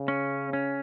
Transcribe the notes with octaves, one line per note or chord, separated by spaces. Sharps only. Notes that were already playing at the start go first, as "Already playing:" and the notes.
Already playing: C#3
C#4
C#4